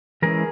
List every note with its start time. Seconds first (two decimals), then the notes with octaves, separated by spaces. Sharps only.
0.22 E3 G#3 C#4 E4 G#4 A#4